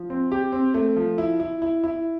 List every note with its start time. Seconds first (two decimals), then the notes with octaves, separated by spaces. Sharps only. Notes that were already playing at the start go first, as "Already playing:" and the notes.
Already playing: F3
0.10 C4
0.32 G4
0.52 C4
0.74 A3
0.96 F3
1.18 E4
1.40 E4
1.62 E4
1.84 E4